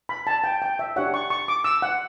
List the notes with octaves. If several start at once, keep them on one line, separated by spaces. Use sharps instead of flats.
B5
A5
G5
G5
E5
D4 G4 C#5 F#5
C#6
C#6
D6
E6
F#5